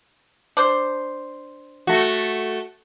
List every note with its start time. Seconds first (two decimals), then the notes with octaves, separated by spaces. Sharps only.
0.57 D4 C5
1.87 A3 F#4